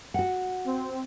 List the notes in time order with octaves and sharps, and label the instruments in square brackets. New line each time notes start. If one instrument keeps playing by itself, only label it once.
[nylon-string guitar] F#4 F#5
[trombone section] C4